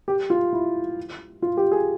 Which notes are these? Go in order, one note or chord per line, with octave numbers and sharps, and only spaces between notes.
G4
F4
E4
F4
G4
G#4